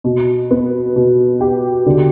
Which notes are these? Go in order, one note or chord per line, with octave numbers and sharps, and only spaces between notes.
B2
B3
B2
G4
D3